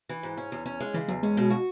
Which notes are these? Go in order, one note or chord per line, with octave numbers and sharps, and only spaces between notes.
E3
G#2
C#4
E2
C#4
G#3
C#3 E3
E2 F#3
G#3 C#4
B2
F#4